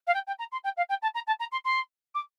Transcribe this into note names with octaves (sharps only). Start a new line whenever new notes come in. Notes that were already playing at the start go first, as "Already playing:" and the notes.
F5
G5
G5
A#5
C6
G5
F5
G5
A5
A#5
A5
A#5
C6
C6
D6